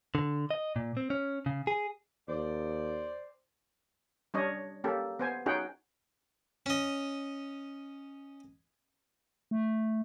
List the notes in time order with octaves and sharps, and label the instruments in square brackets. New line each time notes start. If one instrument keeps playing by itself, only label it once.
[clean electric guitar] D3
D#5
A#2
C4
C#4
C#3
G#4
[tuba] D#2 [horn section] C5 D5
[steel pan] G3 C#4 D4 C#5 D#5
A#3 C#4 G4 A4
B3 C5 G#5
C#4 D#4 F#4 G#4 F#5 G5
[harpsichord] C#4 D#5
[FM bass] A3